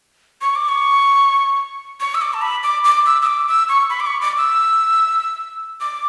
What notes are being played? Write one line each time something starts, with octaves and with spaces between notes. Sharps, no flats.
C#6
D6
C#6
C#6
E6
D6
A5
B5
D6
D6
E6
E6
D6
E6
C#6
B5
D6
C#6
D6
E6
D6